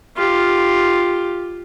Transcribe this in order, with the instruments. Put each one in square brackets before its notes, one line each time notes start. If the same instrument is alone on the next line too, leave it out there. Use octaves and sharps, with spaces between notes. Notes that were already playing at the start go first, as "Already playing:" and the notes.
[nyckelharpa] F4 G4